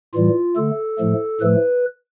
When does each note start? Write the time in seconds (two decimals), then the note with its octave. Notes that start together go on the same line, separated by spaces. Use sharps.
0.14 A2 E3 G3 F4
0.56 D3 A3 A4
0.99 A2 F3 A3
1.41 A2 F3 A3 B4